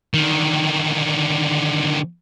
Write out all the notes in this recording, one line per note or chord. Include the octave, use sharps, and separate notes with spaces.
D3 D#3